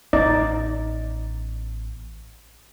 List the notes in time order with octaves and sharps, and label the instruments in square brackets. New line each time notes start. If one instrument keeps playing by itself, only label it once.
[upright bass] A1 B3 [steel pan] D#4 D5